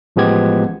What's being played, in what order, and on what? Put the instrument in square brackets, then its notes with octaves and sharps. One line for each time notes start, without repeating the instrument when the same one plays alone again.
[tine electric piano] A1 F3 G#3 B3 G4 G#6